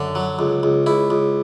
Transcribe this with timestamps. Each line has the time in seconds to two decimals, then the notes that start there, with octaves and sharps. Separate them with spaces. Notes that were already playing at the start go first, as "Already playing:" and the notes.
Already playing: F#2 D3
0.15 F#3
0.39 C#2
0.63 C#2
0.86 C#2 E4
1.10 C#2